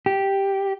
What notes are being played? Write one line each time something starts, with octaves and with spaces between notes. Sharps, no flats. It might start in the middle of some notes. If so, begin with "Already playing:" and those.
G4